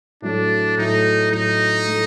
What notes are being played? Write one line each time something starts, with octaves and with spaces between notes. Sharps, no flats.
A2 F#3 A3 D4
A2 F#3 A3 D#4
A2 F#3 A3 D#4
A2 F#3 A3